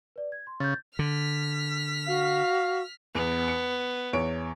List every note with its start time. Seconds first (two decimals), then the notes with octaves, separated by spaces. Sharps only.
0.16 B4 D5
0.32 G#6
0.47 C6
0.60 C#3 G6 A6
0.99 D3 F6 B6
2.08 F#4 F5
3.15 E2 B3
3.48 C#7
4.13 E2 C#5 D7